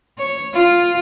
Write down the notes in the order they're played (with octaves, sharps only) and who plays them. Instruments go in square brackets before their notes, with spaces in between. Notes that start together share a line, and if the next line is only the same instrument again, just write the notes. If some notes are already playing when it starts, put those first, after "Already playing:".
[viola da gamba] C#5
F4